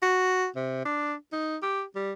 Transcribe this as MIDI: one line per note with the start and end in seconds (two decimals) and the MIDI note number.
0.02 0.47 66
0.56 0.81 48
0.86 1.14 62
1.33 1.57 63
1.63 1.84 67
1.96 2.13 55